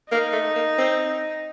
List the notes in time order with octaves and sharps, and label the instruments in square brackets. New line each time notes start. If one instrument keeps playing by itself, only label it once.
[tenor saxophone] A#3 [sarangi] D#4
[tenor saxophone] A3
A#3
C4